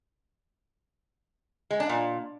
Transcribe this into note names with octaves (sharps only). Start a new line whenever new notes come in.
G#3
D4
A#2